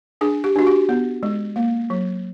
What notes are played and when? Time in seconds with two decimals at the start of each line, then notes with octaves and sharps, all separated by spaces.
0.21 D4 G#4
0.44 G4
0.56 D4 F#4
0.67 G4
0.89 B3
1.23 G#3
1.56 A#3
1.90 F#3